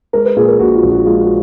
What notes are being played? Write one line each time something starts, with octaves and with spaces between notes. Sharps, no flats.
G#3 A#4
B4
A#2 G#4
A#4
A#1 F#4
F4
A#1
F#4
G#3 F4
F#4